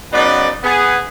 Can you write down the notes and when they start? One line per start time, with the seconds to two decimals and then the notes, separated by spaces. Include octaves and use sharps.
0.13 C#3 F#3 B3 D#4 B4 D5
0.64 B3 G#4